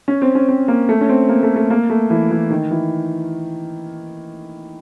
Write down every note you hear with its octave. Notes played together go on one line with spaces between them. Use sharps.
C#4
C4
C#4
C4
A#3
A3
C#4
C4
A#3
A3
A3
A#3
A3
E3
E3
D#3
E3